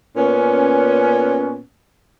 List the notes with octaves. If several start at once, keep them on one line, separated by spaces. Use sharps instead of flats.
A#2 B3 C#4